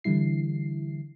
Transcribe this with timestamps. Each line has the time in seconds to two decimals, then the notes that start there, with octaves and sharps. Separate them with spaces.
0.04 D3 E3 G3 E4 C7